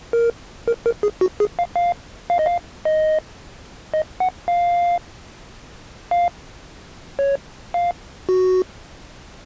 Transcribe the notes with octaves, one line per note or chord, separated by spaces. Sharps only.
A#4
A#4
A#4
G#4
F#4
G#4
F5
F5
F5
D#5
F5
D#5
D#5
F#5
F5
F5
C#5
F5
F#4